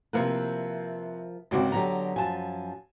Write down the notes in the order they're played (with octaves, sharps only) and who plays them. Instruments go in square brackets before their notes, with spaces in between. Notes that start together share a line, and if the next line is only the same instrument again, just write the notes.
[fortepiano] C3 C4 B4 [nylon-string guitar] F3 A#3 E4
[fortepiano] G#1 C#2 D6 [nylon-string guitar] C4 F#4 C#5
[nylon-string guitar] D3 F#3 B3 [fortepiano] G4 A#5
[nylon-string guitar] F#2 F3 [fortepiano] G#5 A5